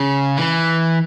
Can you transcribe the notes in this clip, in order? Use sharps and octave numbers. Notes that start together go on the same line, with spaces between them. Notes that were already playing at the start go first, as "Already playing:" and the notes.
Already playing: C#3
E3